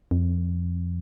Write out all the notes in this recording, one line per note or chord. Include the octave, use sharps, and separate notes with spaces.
F2